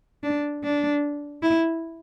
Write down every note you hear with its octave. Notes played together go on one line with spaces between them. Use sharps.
D4
D4
E4